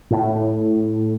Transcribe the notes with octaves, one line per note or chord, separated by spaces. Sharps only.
A2